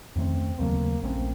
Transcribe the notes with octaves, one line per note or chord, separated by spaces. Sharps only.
F2 D#3 A3 C4 C#4
D#2 C#3 F#3 A3 A#3
A#1 A#2 A3 C4 C#4